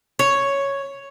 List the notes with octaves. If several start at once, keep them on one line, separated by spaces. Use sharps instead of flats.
C#5